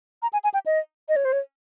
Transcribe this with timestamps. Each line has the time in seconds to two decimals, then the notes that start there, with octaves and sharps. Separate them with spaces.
0.22 A#5
0.33 G#5
0.44 G#5
0.54 G5
0.66 D#5
1.09 D#5
1.16 C#5
1.25 C5
1.33 C#5